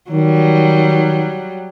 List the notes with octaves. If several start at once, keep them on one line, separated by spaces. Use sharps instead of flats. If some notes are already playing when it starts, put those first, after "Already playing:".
D#3 F#3 G3